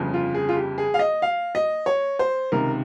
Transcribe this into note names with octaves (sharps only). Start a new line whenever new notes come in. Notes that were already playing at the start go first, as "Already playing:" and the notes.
Already playing: G1 F2 C#3
F4
G#4
F4
G4
G#4
F5
D#5
F5
D#5
C#5
C5
C#2 C3 D#3 A#4